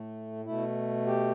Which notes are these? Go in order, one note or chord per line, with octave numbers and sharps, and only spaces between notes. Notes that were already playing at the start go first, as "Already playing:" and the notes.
Already playing: A2 A3
B2 A3 E4
G4